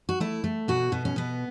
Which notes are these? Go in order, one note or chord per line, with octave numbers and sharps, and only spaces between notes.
F#4
A3 E4
A3
B2 F#4
B2 B3
C#4
B2 B3